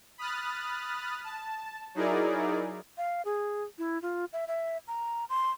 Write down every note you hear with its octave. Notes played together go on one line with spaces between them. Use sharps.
B5 D#6 F6 F#6 A6
A5
F#3 D#4 E4 G#4 A#4 D5
F5
G#4
E4
F4
E5
E5
A#5
C6